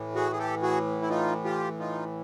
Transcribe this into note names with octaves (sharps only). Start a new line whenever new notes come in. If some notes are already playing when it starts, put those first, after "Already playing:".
Already playing: A2 E3
F#4 G#4
G#4
G4 A4
F#4 G#4
E4
D#4 F4
F4 G4
D#4 F4